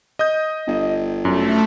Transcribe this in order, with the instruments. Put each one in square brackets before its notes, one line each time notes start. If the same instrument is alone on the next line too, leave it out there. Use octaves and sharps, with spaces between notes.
[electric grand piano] D#5 D#6 G6
[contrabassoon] G1
[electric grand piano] F#2 [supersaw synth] A3